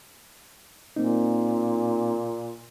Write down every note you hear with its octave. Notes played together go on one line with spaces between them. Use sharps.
A#2 A#3 C4 D#4